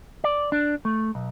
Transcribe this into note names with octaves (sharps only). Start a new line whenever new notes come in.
D5
D4
A3
B1